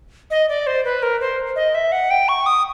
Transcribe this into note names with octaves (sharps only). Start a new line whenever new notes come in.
D#5
D5
C5
B4
A#4
C5
D#5
E5
F#5
G5
C#6
D#6